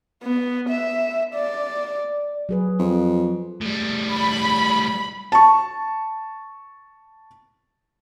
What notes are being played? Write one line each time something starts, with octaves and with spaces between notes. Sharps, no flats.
B3
E5
D5
F#3 G#4 B4
F2
A2 G3
B5
A5 C#6